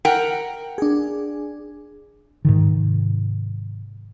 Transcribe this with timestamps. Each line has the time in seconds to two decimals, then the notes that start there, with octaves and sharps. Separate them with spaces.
0.05 A#4 F#5 G5
0.78 D4 G#4
2.45 G#2 C3 D#3